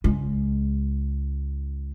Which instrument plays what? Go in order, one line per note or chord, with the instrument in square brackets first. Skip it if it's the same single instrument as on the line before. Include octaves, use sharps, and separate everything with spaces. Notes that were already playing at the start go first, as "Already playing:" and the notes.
[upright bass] C#2 G#3